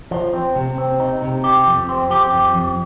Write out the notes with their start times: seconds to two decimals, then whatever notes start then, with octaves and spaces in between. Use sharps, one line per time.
0.11 F3
0.33 C4
0.55 C3
0.78 C4
1.00 D#4
1.22 C3
1.44 G4
1.67 F2
1.89 C4
2.11 G4
2.33 F2
2.55 F2